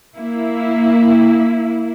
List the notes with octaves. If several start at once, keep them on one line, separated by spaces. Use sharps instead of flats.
A#3 E4